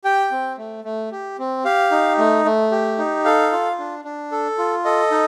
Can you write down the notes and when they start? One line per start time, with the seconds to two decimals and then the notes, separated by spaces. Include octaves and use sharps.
0.04 G4 G5
0.31 C4
0.58 A3
0.84 A3
1.12 G4
1.39 C4
1.64 G4 F5
1.91 D#4
2.18 A3
2.45 A3
2.71 G4
2.98 D#4
3.25 A4 F5
3.52 F4
3.79 D4
4.05 D4
4.32 A4
4.58 F4
4.85 A4 D#5
5.11 D#4